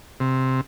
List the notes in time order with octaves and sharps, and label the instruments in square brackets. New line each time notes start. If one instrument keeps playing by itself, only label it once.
[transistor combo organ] C3